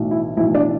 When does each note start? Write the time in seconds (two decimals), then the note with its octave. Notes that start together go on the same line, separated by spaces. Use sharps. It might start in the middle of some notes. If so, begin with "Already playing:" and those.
Already playing: B1 A2 E3
0.11 E4
0.37 B1 A2 E3 E4
0.55 D4